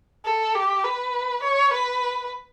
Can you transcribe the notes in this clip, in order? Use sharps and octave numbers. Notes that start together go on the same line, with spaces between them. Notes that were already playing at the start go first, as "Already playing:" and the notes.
A4
G4
B4
C#5
B4